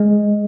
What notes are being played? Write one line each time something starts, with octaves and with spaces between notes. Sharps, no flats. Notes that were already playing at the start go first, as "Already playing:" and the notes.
Already playing: G#3